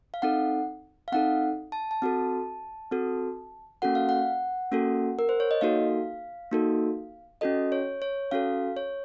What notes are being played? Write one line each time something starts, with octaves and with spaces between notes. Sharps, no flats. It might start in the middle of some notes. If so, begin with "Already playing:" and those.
F5
C4 D#4 A4 F#5
F5
C4 D#4 A4 F#5
A5
A5
C4 F#4 A4
C4 F#4 A4
A#3 C#4 F#4 A4 F#5
F5
F#5
A#3 C#4 F#4 A4
A#4
C5
C#5
D#5
A#3 D#4 F#4 A4 F5
A#3 D#4 F#4 A4
C#4 F#4 A4 D#5
C#5
C#5
C#4 F#4 A4 F5
C#5